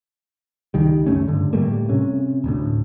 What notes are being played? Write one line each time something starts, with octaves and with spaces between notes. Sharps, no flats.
C#2 D#3 G3
F#2 A2 A3 C#4
G2 D3
A2 G3 A3 A#3
C3 C#4
D1 D2 A2